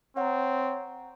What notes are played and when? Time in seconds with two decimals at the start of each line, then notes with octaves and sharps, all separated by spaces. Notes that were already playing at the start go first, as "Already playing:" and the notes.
0.17 C4 C#5 F#5 A#5